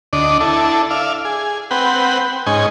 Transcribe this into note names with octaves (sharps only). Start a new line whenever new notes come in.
D2 D4 D5 D#5
D4 E4 A4
D5 E5 F5
G#4
C4 B4 F#5 G5
G#2 C#4 D#4 G#5